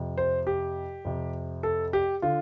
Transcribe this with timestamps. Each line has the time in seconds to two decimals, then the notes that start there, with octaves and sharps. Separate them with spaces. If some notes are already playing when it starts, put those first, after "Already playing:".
Already playing: F2 C3
0.18 C5
0.47 G4
1.05 F2 C3
1.63 A4
1.93 G4
2.22 D3 F4